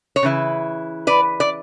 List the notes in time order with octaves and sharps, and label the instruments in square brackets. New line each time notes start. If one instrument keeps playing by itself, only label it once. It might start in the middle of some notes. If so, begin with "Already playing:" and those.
[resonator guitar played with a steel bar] C#5
C#3 E3 E4
B4 D5
D5